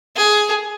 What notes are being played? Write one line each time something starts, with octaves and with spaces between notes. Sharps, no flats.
G#4